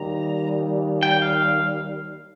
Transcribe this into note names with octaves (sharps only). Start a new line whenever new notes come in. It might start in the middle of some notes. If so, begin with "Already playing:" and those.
Already playing: D#2 D#3 G3 A#5
G5
F5